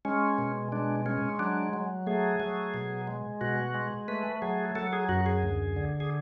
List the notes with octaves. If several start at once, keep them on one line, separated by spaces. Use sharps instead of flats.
G#3 C#4
B2
G#3 D4
G#3 C#4
F#3 D4
F#3
A3 G#4
F#3
B2
G#3
B2 F#4
G#3
A3 B4
F#3 G#4
F#3 A4
G#4
F#2 F#4
G#4
D2
D3
G#4